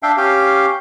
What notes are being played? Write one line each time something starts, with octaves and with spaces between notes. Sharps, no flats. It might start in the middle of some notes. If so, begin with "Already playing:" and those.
D4 E5 F5 G5
C#4 G4 F5 G5